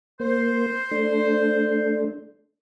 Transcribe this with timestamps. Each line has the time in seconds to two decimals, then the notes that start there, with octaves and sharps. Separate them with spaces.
0.20 A#3 C5
0.91 A3 D4